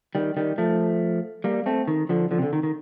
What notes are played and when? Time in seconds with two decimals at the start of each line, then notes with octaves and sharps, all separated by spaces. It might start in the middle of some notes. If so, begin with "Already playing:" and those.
0.15 D#3 G3
0.37 D#3 G3
0.58 F3 A3
1.44 G3 A#3
1.66 A3 C4
1.88 D#3
2.09 D3 F3
2.31 D3 F3
2.38 C3
2.42 D3
2.53 D#3
2.63 D#3